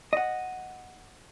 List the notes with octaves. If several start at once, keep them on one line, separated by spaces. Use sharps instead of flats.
D#5 F#5